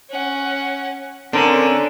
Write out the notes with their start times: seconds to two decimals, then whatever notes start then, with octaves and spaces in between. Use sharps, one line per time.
0.10 C#4 F#5
1.33 D3 C4 C#4 A#4